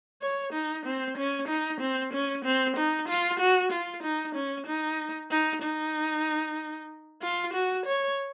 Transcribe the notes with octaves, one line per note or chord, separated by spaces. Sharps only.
C#5
D#4
C4
C#4
D#4
C4
C#4
C4
D#4
F4
F#4
F4
D#4
C#4
D#4
D#4
D#4
F4
F#4
C#5